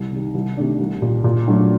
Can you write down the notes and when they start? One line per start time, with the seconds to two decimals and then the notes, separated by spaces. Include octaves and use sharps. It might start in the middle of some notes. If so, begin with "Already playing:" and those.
Already playing: C2
0.12 C3 D#3 G3
0.35 C2
0.57 C3 D#3 A3 D4
0.80 C2
1.02 A#2 G3
1.24 A#2
1.47 F#3 A3 D4 F#4